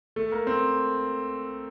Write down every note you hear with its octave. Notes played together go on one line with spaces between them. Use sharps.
A3
A#3
C4